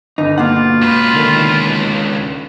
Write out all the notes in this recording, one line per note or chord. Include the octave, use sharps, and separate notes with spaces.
G1 D#4
B2 A#3 F4 F#5
C#2 B4
D3 D#3